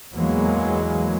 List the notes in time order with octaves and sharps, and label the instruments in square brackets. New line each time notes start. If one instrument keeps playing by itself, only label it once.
[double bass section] E2 E3 F#3 G#3 A#3